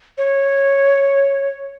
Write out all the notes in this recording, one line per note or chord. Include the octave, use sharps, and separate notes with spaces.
C#5